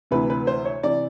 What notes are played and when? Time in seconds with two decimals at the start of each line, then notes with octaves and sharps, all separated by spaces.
0.11 D2 C3 E3 B4
0.30 B4
0.47 C5
0.65 C#5
0.83 C3 E3 D5